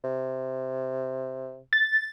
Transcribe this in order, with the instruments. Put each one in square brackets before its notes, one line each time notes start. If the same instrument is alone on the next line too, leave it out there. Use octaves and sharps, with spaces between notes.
[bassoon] C3
[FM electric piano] A6